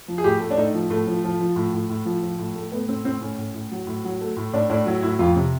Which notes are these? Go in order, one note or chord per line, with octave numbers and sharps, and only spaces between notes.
F3
G#4
A2 G4
A3
D4
A2 D#4
F3
A2 A3
F3
F3
F3
A2
A2
A2
F3
F3
A2
A3
A3 B3
A2 C4
A2 C4
A2 C#4
A2
A2
F#3
A2
F#3
A3
A2
A2 D4
A2 D4
F#3 E4
A2 E4
F2 F4
C3